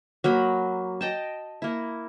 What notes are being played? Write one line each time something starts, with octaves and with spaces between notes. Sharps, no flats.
F#3 A#3 B5
D#5 G5 A5
A#3 E4